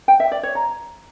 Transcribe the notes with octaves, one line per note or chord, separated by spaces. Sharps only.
G5
E5
D5
C#5
A#5